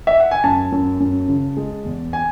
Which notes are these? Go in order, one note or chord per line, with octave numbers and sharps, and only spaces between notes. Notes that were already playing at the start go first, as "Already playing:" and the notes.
E5
F#5
G#5
F#2 A5
F#2
F#2
C#3
G#3
E2
G#5